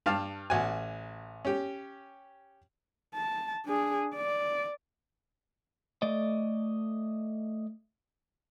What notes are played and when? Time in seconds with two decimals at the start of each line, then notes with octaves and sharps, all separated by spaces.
0.06 G2 F5 A5
0.50 A1 F#4 G#5
1.45 C#4 G4
3.15 A5
3.67 D4 G#4
4.15 D5
6.02 A3 D5 D#5